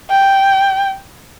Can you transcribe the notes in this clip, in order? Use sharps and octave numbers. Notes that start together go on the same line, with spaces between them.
G5